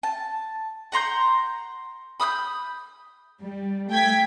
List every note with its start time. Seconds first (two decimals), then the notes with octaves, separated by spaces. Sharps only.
0.03 A5
0.92 F#5 A#5 C6 G6
2.20 B5 D#6 E6 G6
3.41 G3
3.90 A3 G5 G#6 B6